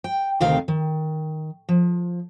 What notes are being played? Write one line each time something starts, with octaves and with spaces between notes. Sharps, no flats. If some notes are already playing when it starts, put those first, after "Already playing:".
G5
D2 C3 D#3 C4 F5
D#3
F3